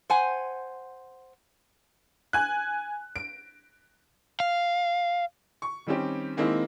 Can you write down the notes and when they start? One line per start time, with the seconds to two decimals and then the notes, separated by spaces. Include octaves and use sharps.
0.10 C5 F#5 G#5
2.33 G#5 F#6
3.16 D7
4.40 F5
5.62 C#6
5.87 D#3 G3 C4 C#4 G4
6.37 D#3 G#3 A#3 C4 D#4 E4